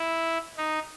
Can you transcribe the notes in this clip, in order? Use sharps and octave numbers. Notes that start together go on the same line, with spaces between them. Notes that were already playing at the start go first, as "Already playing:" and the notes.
Already playing: E4
D#4